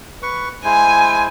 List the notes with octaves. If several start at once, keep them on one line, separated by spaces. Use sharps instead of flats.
B4 C#6
G#3 E4 C5 G#5